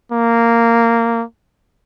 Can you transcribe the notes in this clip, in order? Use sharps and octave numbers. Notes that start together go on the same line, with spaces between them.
A#3